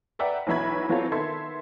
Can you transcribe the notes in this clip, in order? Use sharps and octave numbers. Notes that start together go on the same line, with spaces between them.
B4 D5 E5 F#5 G5 A#5
B1 E3 F#3 E5 B5 G#6
E3 F#3 C4 F4 A4 C#5
D#3 B3 A4 E5 C6 G#6